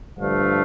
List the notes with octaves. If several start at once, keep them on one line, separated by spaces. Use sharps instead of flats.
G2 D3 F3 A3 F5